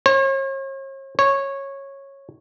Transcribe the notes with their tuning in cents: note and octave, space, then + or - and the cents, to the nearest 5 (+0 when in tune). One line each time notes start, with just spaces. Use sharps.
C#5 -45
C#5 -15